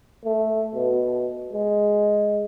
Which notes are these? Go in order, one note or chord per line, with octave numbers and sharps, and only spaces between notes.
A3
B2
G#3